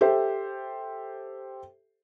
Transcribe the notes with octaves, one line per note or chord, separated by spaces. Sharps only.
G4 A4 C5 E5